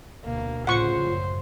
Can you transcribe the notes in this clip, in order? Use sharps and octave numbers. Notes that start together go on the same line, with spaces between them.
D2 B2 A#3
A1 D2 C#3 F4 C5 F#5 C#6
F#2